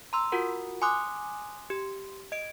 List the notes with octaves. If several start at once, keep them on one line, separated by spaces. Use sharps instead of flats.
A#5 C6 E6
F4 F#4 A#4 F#5
G#5 C6 D6 D#6 F#6
G4
D#5 D7